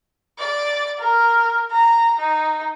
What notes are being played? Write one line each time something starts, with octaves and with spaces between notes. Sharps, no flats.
D5
A#4
A#5
D#4